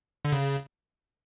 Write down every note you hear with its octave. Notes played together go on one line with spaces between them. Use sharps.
D3
C#3